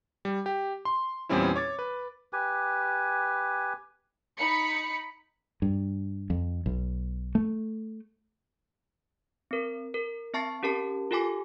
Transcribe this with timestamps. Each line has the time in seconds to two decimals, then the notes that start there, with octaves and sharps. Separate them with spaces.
0.25 G3
0.46 G4
0.85 C6
1.29 E2 A#2 G3 C4 C#4 E4
1.56 C#5 D6 A6
1.79 B4
2.33 G4 B4 G#5
4.37 D#4 B5 C#7
5.62 G2
6.30 F2
6.66 B1
7.35 A3
9.51 C4 A#4
9.94 A#4
10.34 C4 E5 A5 C#6 A6 C7
10.63 C#4 G4 A#4 A5
11.11 F4 G4 A4 G#5 D6